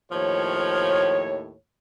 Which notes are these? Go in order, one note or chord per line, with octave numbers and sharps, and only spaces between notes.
D#2 A2 F3 C#5